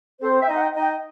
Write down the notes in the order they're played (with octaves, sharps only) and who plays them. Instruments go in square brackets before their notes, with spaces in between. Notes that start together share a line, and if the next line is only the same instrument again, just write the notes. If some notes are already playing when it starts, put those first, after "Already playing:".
[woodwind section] C4 C5 [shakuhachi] A4
[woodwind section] E5 [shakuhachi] G5
[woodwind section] D#4 D#5
[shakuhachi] F#5
G5
[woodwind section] D#4 D#5
[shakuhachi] G5